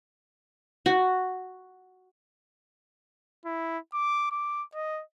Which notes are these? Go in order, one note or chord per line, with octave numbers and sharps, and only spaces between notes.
F#4
E4
D6
D6
D#5